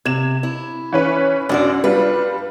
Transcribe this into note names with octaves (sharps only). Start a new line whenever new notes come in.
C3 G#6 E7
E4
E3 C#4 B4
F#2 D4 F#4 D5
G3 D4 F4 B4